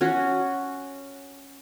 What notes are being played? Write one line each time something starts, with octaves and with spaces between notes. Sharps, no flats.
C#4 F#4